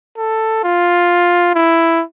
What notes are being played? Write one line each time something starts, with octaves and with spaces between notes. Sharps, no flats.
A4
F4
E4